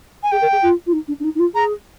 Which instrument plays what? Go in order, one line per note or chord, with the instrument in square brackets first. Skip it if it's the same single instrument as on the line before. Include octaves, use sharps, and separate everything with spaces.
[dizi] G#5
[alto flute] G#4 [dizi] G5
[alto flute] A#4
G#4
F4
F4
D#4
D4
D4
D#4
D#4
F4
[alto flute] G#4 [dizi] A#5